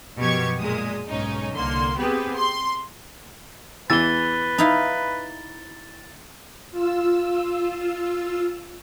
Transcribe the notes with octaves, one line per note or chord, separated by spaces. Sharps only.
F#2 B2 F3 G4 C#6 G#6
A#2 G#3 D#6
B1 G#2 C#4 D#4
C2 D3 A#3 C6
B3 C4 G4 G#4 B4
C6
E2 E3 B4 E6 A6 G7
D#4 E4 F5
F4 E6